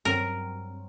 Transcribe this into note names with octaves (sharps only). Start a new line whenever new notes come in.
G2 F#3 C4 A#4